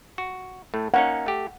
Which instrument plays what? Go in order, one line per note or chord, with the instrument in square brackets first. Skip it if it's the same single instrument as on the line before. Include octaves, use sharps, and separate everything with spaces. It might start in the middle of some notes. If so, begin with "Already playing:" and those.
[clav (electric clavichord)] F#4
A2 A3
[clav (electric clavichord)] A#3 C#4 D#4 [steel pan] F#5
[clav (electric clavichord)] A3 G4